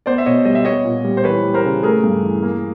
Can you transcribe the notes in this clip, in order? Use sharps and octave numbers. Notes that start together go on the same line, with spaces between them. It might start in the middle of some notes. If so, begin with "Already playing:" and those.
B3 C5 D5
E5
B2 C#5 D#5
G3 D#5
E5
B3 C#5 D#5
A#2
G3
C5
E3 B4 C#5
G3
A#4 C5
C#3
A3 G#4 A#4
G2
E3
A#3